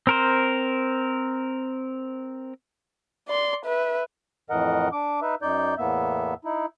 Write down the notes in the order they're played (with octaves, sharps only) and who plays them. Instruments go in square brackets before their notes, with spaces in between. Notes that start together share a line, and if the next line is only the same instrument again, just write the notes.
[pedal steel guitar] C4 A#4 C5
[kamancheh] D5 C6
B4 E5
[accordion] F2 A2 E3 A#4 D#5 F#5
D4 D6
D#4 B4 E5
F#2 D#4 D5 G6
E2 A2 A#3 B3 E5
D#4 E4